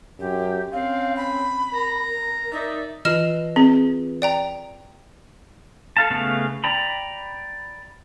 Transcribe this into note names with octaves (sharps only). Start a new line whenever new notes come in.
F#2 G4
C4 C#4 F5
B5
A#4 A#5
D#4 D5 E5
E3 F4 B4 D#5 F6 E7
C4 G#4
D5 G5 A#5
A4 F5 A5
C#3 A3 B3 F5
D5 G5 A#5 B5